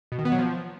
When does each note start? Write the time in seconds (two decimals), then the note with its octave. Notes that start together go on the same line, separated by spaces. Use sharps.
0.12 B2
0.18 D#3
0.25 B3
0.32 F#3
0.38 F3